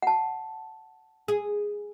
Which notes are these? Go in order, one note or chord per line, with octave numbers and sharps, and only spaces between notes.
F#5 A5
G#4